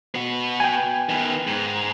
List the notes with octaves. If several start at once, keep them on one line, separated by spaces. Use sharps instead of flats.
B3 F#4
G5 G#5
D#3 B3
G#2